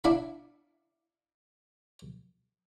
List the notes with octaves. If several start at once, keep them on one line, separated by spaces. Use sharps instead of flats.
D4 E4 F5 B5